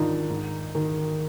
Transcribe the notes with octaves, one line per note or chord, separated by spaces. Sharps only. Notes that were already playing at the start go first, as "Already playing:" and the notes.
Already playing: G#2 D#3 D4 D#4 F4
G#2
D#3